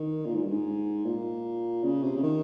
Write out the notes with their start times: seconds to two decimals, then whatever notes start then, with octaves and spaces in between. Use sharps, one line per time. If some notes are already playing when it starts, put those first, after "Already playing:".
Already playing: D#3
0.26 A#2
0.35 G#2
0.43 G2
0.51 G#2
1.05 A#2
1.84 C#3
2.03 C3
2.16 C#3
2.23 D#3